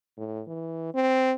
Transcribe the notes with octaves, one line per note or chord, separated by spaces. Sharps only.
A2
E3
C4